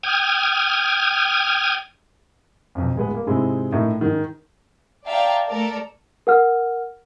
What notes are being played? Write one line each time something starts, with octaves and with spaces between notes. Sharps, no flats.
G5 D#6 F6 G#6
B1 F2
D1 G#3 B3
A#3
G#2 C3 G#3 C4 E4
A#1 A2 D#4 A4 A#4
G#2 D#3
D5 E5 F5 G5 A5 A#5
A3 A4 A#4 D5
A#4 F#5 F6